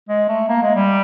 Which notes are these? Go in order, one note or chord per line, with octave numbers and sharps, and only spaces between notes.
G#3
A3
A#3
G#3
G3